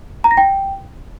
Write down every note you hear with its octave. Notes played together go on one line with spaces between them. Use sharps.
A#5
A#6
G5